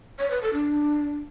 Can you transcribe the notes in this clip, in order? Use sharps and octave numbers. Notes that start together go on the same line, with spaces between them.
C#5
B4
A4
D4